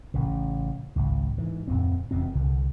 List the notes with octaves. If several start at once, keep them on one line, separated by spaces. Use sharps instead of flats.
A1 C#3
G#1 C#2
G#2 E3
D1 F2 C4
E1 F2 B2 C4
C2 D3